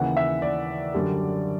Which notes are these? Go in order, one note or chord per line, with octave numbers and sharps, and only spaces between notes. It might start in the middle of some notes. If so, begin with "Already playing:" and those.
Already playing: D#2 C#3 E3 F#5
E5
D5
F#2 D3 G3